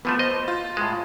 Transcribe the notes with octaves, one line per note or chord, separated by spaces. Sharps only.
E3 F3 A3 B3
C5 D#5
F4
A2 G#3